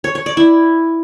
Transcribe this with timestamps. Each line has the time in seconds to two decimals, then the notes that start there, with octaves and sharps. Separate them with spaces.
0.04 C#5
0.15 C#5
0.26 D5
0.37 E4